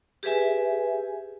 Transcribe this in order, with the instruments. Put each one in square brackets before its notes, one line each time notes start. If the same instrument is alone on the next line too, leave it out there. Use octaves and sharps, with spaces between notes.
[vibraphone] G4 G#4 B4 E5 G#5